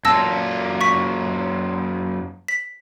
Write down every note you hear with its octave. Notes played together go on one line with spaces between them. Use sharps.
F#2 A#3 F4 A5 E6 A#6
C#6 B6
B6